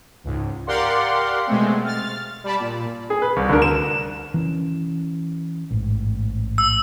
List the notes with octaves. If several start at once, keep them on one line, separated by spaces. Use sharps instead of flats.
C#2 G#2
G4 A#4 D5 F5 F#5 C6
B2 G#3 A3 C4
F6 A6
G3 D5 A5 B5
A#2
G#4
B4
C2
D2 D3 A#4
E7
E3 C#4
A1 G#2
E6